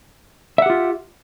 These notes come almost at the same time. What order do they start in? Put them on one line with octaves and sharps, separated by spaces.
E5 F#5 G4 F4